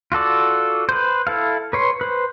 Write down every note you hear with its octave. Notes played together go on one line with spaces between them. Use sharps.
F4 F#4 A4 D5
B4 C5
E4 A4 F5
B4 C#5 C6
B4 C5